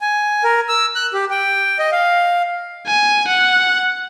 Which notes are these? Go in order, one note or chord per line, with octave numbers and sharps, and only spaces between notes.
G#5
A#4
E6
F#6
G4
G5
D#5
F5
G#5
F#5